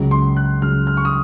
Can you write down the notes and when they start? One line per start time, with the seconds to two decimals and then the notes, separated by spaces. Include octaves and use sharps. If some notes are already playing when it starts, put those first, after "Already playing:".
Already playing: C#2 C#3 F#3
0.11 C6
0.36 F#6
0.61 C#2 C#3 F#3 F6
0.87 F6
0.97 C#6
1.05 D#6